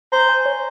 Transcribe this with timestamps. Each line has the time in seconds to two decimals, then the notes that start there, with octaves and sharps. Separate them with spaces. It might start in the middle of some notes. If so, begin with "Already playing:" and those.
0.12 C5 A#5
0.29 G#5
0.45 C#5